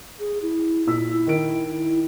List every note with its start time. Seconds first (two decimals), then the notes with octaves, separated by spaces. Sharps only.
0.19 G#4
0.42 E4
0.87 A#2 E6 B6
1.09 E4
1.27 D#3 A#4 D7